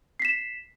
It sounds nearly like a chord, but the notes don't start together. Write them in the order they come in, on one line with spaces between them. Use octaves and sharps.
C7 B6 E7